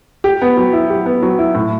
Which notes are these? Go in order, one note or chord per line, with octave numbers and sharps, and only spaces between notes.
G4
B3
F#3
E4
G4
B3
F#3
E4
A2